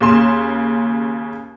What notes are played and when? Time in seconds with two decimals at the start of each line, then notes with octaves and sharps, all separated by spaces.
0.01 D#2 C#3 C6 E7